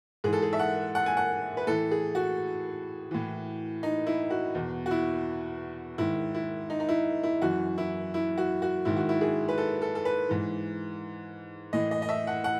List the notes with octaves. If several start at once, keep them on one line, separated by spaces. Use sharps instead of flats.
G#2 E3 G#4
A4
G#4
E5
F#5
F#5
G#5
F#5
B4
A2 E3 A4
G#4
F#4
A2 E3
D#4
E4
F#4
E2 B2
F#4
E4
G#2 D#3 E4
E4
D#4
D#4
E4
E4
F#2 E3 F#4
E4
E4
F#4
F#4
G#2 D#3 E4
F#4
E4
G#4
B4
A4
A4
A4
B4
G#2 E3
A2 E3 D#5
D#5
D#5
E5
F#5
F#5